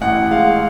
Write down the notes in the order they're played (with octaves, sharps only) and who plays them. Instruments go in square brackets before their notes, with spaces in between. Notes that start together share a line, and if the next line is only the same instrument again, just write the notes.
[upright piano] A1 F#5
G#3 F5